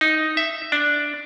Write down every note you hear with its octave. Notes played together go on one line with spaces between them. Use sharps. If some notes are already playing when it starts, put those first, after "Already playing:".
D#4
E5
D4